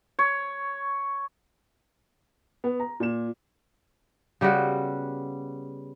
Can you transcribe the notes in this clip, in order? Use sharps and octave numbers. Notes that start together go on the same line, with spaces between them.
C#5
B3
A#5
A#2 E7
C#3 G3 B3 F#4